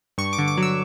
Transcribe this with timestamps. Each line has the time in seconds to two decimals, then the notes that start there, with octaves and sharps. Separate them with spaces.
0.18 G2 C#6
0.33 D6
0.38 D3
0.48 D6
0.57 F#3
0.63 E6